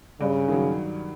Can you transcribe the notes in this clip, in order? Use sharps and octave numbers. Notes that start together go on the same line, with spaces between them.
G2 C#3
D#3 F#3